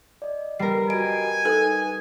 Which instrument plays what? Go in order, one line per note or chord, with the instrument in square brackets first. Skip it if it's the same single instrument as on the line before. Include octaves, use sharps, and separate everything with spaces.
[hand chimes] D5 D#5
[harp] G3 A#4 [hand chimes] B4 B5 C7
[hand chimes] F#4 A4 D#5 [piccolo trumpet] G#5 [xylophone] D7
[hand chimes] D#4 D#6 [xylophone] A4 B4